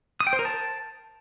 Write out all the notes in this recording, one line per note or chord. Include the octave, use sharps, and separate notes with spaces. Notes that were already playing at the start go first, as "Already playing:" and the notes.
D#6
G5
C5
A#4
A5